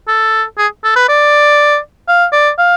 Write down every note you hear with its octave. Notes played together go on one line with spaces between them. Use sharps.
A4
G#4
A4
B4
D5
F5
D5
F5